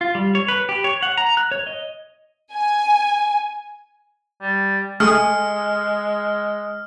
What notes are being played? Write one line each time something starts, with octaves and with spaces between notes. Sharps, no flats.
F4
G3
C#5
B4
G4
C#5
F#5
A#5
F#6
C#5
D#5
G#5
G3
G#3 A3 G#4 G#5 F6